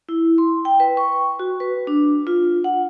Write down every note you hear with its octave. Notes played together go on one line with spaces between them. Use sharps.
E4
C6
G5
B4
C#6
F#4
B4
D4
F4
F#5